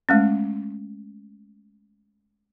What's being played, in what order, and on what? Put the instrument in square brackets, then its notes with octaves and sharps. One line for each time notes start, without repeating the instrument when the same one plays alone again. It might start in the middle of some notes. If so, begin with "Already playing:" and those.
[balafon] G#3 A3 C#4